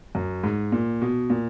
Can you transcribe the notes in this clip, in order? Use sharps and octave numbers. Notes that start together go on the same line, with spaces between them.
F#2
G#2
A#2
B2
A#2